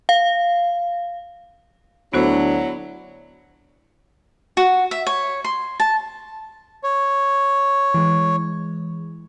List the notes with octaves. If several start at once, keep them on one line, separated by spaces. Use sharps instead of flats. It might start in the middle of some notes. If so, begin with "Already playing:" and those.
F5
D2 F#3 B3 D4 E4 F#4 C5
F#4
E5
C#5
C6
A5
C#5
E3 G#3